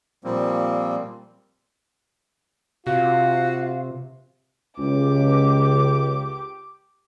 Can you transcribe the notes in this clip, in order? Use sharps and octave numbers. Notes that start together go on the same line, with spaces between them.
A#2 F3 G3 A#3 C4
C3 F4 F#4 F5
C#2 G4 D6